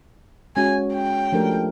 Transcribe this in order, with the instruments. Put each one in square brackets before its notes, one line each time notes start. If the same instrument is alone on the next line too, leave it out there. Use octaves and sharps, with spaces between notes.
[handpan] G#3 C#4 F#4 [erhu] G#5
[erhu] G5
[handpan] F3 A3 D4 G4 A#4